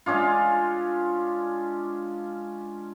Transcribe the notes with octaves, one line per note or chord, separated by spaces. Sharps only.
G#3 C#4 D4 F4